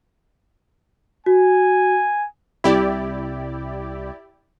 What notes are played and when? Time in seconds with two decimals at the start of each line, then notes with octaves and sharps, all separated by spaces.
1.26 F#4 G#5
2.64 C2 E4 G4 D5